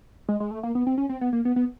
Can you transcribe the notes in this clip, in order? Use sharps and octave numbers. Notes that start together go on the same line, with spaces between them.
G#3
G#3
A3
A#3
B3
C4
C#4
C4
B3
A#3
B3
B3